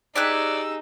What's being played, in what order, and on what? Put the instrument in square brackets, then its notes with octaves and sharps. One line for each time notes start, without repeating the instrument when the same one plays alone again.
[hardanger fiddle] D#4 [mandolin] G4 G#4 F#6 [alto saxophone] D5 [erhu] E6